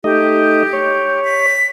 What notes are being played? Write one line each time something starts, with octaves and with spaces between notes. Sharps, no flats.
A3 D#4 G4 D#5
C#5
B6